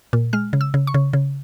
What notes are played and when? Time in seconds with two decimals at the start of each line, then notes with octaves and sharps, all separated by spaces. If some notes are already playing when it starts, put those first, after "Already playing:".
0.13 A#2
0.33 G#3 F6
0.53 C#3
0.61 E6
0.74 C#3
0.87 C#6
0.94 C#3
1.13 C#3